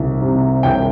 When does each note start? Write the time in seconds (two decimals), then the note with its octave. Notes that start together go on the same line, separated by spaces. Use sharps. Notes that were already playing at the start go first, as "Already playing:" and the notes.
Already playing: C2 D#3
0.22 C3
0.63 C2 G5